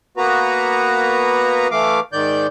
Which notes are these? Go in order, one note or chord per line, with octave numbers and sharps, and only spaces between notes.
A#3 B3 F#4 B4 A#5
E3 A3 F5 D6
G#2 D#3 D5 G6